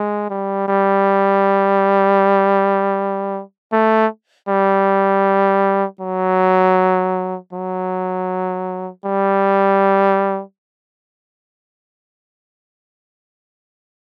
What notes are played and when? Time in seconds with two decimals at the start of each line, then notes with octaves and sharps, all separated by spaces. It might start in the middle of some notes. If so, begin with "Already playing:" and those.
Already playing: G#3
0.30 G3
0.68 G3
3.72 A3
4.48 G3
6.00 F#3
7.53 F#3
9.05 G3